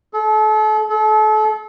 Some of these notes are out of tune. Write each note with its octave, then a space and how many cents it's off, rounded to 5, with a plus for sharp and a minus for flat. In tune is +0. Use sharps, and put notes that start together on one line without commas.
A4 -35
A4 -35